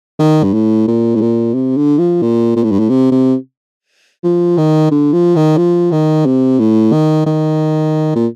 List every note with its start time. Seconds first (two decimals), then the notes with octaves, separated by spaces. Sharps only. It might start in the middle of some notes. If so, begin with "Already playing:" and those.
0.19 D#3
0.43 G2
0.54 A2
0.88 A#2
1.15 A2
1.21 A#2
1.54 C3
1.77 D3
1.99 F3
2.22 A#2
2.56 A#2
2.64 A2
2.72 G2
2.80 A2
2.89 C3
3.11 C3
4.24 F3
4.58 D#3
4.91 D3
5.13 F3
5.36 D#3
5.58 F3
5.92 D#3
6.26 C3
6.59 A2
6.92 D#3
7.26 D#3
8.15 A#2